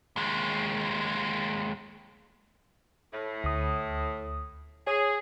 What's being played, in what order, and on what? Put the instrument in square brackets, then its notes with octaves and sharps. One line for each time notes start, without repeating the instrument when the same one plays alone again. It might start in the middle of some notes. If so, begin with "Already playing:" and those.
[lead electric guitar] D#2 G#3
[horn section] A2
[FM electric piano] D2 D#6
[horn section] G#4 [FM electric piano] C#5